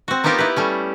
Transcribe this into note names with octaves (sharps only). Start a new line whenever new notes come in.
C4 F#4
A#3 B3 D#4 F4 G4 A#4
E4 B4
G3 A3 C#4